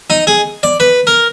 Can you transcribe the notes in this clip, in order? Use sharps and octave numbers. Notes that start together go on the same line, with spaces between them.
D#4
G#4
D5
B4
A#4